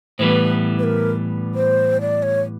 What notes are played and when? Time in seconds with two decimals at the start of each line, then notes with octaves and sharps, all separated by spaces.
0.19 A2 E3 G3 B3 B4 C5
0.79 B4
0.83 A#4
1.55 C5
2.01 D5
2.23 C#5